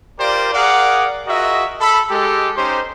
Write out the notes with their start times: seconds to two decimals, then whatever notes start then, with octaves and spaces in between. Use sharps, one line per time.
0.19 F4 G4 A#4 C5 D5
0.54 G#4 A#4 D5 F5 F#5
1.27 F4 F#4 G#4 A#4 D#5 E5
1.81 A4 B5
2.10 G#3 G4 A4
2.56 C#4 D#4 G4 C5